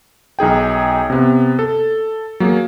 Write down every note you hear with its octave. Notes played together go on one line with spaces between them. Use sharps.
B1 D#4 G#4 G5
C3 B3
A4
F#3 A#3 G#4